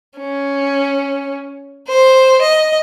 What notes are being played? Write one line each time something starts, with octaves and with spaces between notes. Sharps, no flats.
C#4
C5
D#5